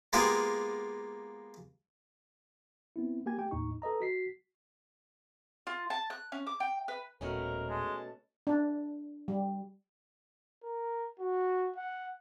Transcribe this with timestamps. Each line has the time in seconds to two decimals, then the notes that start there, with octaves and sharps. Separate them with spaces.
0.13 G#3 A#3 B3 F4 G4 G#4
2.96 B3 C4 E4
3.26 A#3 G4 G#5 G#6
3.38 A3 G4 G5
3.51 D#2 A2 D#4 C#6
3.82 A4 B4 D#5 A#5
4.00 F#4 B6 C7
5.67 F4
5.90 A5
6.10 F#6
6.32 C#4
6.47 D6
6.60 G5
6.88 B4
7.21 D#1 B2 A3 C#4 A#4
7.69 G#3 A5
8.47 D4
9.28 G3
10.63 A#4
11.19 F#4
11.76 F#5